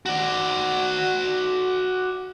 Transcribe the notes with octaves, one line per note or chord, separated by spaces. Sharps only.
F#4 D5